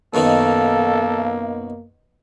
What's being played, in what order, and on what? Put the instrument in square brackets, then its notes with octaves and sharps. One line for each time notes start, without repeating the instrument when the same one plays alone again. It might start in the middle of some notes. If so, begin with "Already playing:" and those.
[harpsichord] F#2 B2 D#3 [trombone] A#3 [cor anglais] A4 [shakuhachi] F5